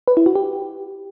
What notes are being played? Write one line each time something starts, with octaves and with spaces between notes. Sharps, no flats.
B4
E4
F#4
G4